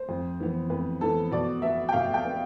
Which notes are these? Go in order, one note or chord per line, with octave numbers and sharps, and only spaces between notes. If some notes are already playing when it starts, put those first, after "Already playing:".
Already playing: C5
F2
E3 B3
F2 B4
E3 B3 A4
B2 D5
B3 E5
G5
B2 F5
G5
B3